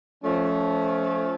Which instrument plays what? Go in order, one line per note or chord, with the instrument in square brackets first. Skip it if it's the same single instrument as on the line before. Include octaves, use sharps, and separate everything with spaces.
[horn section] F3 A3 C#4